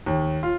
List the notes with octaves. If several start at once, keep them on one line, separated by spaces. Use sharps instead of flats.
D#2
F4